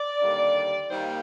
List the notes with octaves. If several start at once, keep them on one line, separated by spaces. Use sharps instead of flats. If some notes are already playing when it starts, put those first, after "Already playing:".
Already playing: D5
D#2 D3 G3 A#3 D#4
D#2 D#3 G3 A#3 D#4 C5